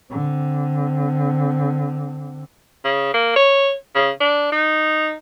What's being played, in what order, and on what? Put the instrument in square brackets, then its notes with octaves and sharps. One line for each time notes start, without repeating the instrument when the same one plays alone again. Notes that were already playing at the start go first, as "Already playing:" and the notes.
[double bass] D3 C4
[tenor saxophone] C#3
A#3
C#5
C#3
D4
D#4